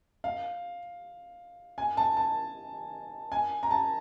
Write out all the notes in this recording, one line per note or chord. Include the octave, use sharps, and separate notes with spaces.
F5
G#5
A5
A5
G#5
A#5
A5